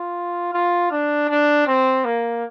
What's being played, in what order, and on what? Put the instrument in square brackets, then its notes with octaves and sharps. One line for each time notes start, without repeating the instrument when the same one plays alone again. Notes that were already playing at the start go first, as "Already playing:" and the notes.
Already playing: [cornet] F4
F4
D4
D4
C4
A#3